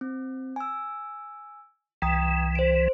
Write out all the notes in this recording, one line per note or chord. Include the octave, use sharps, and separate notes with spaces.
C4
G#5 E6
C2 E3 G5 A#5 D#6
C5 D7